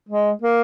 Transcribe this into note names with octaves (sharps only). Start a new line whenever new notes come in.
G#3
A#3